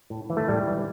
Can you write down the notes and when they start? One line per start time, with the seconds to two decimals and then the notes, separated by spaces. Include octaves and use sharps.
0.10 A2
0.30 E3
0.37 A3
0.48 A2 G3
0.67 E3